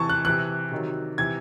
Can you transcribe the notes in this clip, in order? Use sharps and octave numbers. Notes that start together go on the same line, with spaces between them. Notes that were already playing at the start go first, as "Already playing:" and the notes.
Already playing: C3 E3 A5 C#6
F#6
C3 E3 F#6
C3 D#3 F#3
C3 E3 G#6